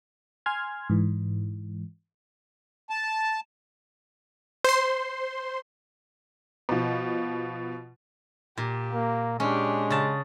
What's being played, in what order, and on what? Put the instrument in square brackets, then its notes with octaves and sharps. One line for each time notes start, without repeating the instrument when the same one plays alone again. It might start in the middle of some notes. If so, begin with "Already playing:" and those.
[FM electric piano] G#5 C6 F6 G#6
G#2 E3
[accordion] A5
[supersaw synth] C5 C6
[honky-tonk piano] B2 F3
[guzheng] A#2 [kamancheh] G4
[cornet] A#3
[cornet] G#3 [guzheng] C#4 [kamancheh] D4 G4
[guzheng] C#3 A5